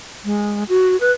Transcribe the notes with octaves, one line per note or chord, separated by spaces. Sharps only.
G#3
F#4
B4